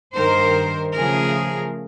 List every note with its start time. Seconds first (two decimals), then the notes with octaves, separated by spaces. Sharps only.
0.16 G2 D#3 G3 A#4 C5
0.95 C#3 F3 A3 G#4 A#4